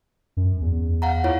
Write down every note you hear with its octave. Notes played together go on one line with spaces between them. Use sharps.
F#2
E2
F5 F#5 A#5
E4 F4 C#5